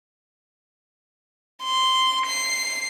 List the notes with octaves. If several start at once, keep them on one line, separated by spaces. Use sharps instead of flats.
C6
C7